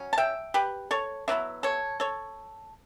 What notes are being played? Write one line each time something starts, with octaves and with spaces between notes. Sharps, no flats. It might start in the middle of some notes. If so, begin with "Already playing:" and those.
Already playing: F#3 C#4
A5
E5 G5
G4 B4
A4 C#5
D3 F#3 B3 E4 E5
A4 C#5
A4 C#5